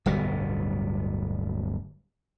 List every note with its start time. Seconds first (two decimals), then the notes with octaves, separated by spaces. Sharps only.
0.06 D1 G1 B2 G3